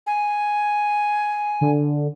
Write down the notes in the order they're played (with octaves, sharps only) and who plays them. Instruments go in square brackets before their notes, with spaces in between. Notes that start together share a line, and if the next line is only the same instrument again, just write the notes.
[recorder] G#5
[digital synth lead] D3